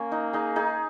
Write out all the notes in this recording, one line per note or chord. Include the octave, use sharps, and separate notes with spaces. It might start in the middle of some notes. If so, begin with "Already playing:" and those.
Already playing: A#3 C#4
D#4
D#4 G#4
D#4 G#4